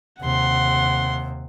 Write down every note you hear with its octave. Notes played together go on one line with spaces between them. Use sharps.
D#2 C3 F#5 C6